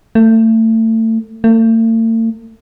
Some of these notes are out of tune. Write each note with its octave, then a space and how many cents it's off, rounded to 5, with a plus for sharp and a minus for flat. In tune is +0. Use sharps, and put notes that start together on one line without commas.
A3 +30
A3 +45